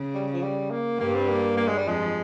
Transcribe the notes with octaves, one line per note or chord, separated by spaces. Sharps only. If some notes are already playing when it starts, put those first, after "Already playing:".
Already playing: C#3
G3
F3
G3
A#3
G2 G3 A#3
C4
A#3
A#3
G#3
G3
F2 F3 G#3